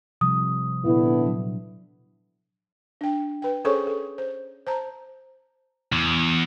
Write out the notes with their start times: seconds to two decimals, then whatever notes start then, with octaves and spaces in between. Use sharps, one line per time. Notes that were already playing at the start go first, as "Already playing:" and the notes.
0.21 C3 F3 G3 D#6
0.85 A#2 D3 B3 D4 E4
1.26 F#3
3.01 D4 G5
3.42 B4 G5
3.64 C#4 G#4 A4 C5 C#5 C#6
3.87 A4
4.18 C5
4.67 C5 A5 A#5
5.92 E2